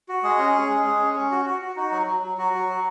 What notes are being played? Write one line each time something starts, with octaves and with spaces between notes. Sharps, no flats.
F#4
G#3 G#4
C#4
C#4
G#3
G#3
C#4
C#4
F#4
F#4
F#4
D#4 F#4
F#3
F#3
F#3
F#3 F#4
F#3
F#3